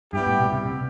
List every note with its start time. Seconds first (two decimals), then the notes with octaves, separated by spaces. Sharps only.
0.13 G2 G3 B3 E4 G4
0.27 A2
0.40 B2
0.53 C3
0.65 C3